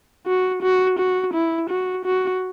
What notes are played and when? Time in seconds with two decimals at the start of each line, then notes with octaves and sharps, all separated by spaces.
0.27 F#4
0.62 F#4
0.99 F#4
1.33 E4
1.70 F#4
2.05 F#4